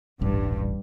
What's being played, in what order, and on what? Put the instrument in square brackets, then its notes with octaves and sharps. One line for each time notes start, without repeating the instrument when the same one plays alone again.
[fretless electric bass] D#1 A1 [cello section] G2